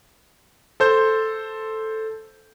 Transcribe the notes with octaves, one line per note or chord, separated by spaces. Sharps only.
A4 C5 G6